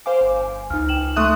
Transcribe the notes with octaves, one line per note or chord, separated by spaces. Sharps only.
C5 F5 G#5 D6
G1
G#5
C#2 D#4 F6
G5 E7 F#7
A3 E5 C6 C#6 D#6 F#6